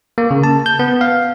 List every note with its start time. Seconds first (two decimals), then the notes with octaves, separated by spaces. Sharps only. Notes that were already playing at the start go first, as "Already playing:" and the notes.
0.18 A#3
0.31 C#3
0.44 A5
0.66 G6
0.79 B3
1.01 F5